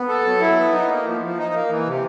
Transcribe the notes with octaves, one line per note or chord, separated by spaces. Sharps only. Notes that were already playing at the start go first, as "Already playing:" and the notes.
Already playing: B3
A4
F#3
E4
B3
D#4
A#3
F3
F3
D#4
A#3
E3
C3